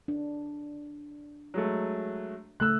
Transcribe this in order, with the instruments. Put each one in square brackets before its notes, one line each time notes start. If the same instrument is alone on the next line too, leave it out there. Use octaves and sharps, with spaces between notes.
[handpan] D4
[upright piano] F#3 G#3 A3
[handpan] C#3 A3 [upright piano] E6 F#6